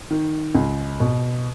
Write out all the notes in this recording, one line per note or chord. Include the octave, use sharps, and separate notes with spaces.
D#3
C#2
B2